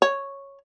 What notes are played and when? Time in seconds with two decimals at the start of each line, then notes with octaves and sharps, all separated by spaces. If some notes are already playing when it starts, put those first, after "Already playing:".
0.02 C#5